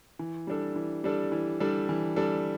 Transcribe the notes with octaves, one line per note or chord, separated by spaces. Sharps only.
E3
G3 D4 A4
E3
G3 D4 A4
E3
G3 D4 A4
E3
G3 D4 A4